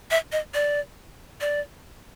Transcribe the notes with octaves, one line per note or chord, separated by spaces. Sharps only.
E5
D#5
D5
D5